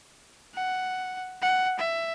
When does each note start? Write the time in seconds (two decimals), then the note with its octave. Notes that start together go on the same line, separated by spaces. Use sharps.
0.55 F#5
1.43 F#5
1.79 E5